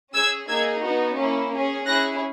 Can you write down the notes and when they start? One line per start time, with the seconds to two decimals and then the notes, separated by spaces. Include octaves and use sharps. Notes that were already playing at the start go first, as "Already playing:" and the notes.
0.14 C#4 G#4 E6 G#6
0.48 A#3 D#4 G#4 E6 G#6
0.84 B3 D#4 F#4
1.18 A#3 C#4 E4
1.52 C#4 G#4
1.87 C#4 E4 G#4 F#6 A#6